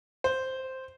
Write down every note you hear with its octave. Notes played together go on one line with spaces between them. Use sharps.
C5